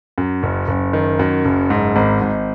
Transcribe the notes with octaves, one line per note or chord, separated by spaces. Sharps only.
F#2
F#1
F#1
D#3
F#2
F#1
G#2
G#1
G#1